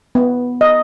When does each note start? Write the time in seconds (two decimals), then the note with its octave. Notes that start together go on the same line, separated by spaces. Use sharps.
0.15 B3
0.61 D#5